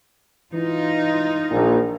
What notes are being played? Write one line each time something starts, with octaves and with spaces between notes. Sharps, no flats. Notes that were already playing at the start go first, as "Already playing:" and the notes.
E3 D#4 F4
A#1